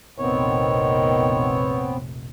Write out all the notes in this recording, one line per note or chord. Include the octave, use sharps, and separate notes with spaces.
F1 A#1 D#3 B3 C4 C#5